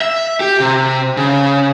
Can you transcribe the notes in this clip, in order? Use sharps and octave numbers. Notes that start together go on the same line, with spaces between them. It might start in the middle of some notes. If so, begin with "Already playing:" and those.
E5
G4
C3
C#3